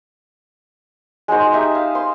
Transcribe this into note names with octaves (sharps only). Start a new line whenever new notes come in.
G#3 D#4 F#4 C5
D#4 G4 G#4 E5
F5
C5 C6